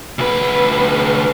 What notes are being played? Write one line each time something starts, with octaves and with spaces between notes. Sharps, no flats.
D2 B4